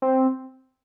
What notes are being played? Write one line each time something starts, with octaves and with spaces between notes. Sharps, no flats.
C4